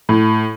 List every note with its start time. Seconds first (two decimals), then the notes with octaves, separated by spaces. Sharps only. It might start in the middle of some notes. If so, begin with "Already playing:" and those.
0.09 A2